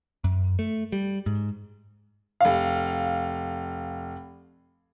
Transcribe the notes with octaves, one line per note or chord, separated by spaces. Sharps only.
F#2
A3
G3
G#2
F1 F5